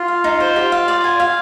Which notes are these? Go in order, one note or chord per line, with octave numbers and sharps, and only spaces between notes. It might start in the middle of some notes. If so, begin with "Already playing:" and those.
Already playing: F4
F5
D#4
C5
G4
F5
D5
G#5
F5